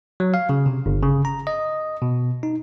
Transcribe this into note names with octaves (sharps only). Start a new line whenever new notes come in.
F#3
F5
C#3
C3
G1
C#3
A#5
D#5
B2
D#4